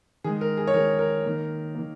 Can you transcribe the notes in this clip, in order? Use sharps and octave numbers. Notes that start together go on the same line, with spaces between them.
D#3 G#3 G#4
A#4
G#4
C#5
D#3 G#3 A#4
A#4
D#3 A#3
D#3 A#3